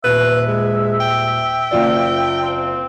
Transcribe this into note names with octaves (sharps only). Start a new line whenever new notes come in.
D#1 B4 E5
G#3
G5
F#1 F4 D5
C4